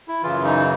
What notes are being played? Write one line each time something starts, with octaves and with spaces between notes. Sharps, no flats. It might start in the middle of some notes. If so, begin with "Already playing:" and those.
E4
F#2 C#3 E3 F4
D#4